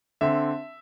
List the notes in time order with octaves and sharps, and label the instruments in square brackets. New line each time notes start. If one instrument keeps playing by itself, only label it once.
[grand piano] D3 C4 E5